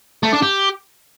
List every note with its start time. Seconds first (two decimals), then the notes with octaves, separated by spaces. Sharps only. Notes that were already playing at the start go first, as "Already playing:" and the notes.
0.23 A3
0.33 D4
0.42 G4